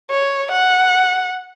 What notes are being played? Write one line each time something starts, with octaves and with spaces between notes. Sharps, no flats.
C#5
F#5